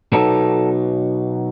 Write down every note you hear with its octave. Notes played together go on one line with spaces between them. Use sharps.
B2 F#3 B3 D#4 A4